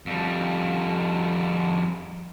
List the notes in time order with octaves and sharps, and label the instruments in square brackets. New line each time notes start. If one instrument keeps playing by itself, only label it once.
[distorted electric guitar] F2 G3